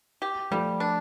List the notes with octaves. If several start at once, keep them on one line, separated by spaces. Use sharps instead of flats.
G4
F3 G3 A3
D4